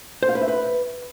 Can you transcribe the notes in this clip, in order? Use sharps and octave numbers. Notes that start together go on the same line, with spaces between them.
C5
F5
B4
E5
B4